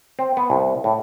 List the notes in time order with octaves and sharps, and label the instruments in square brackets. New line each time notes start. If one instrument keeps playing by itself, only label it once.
[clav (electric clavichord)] C4
B3
C2
A2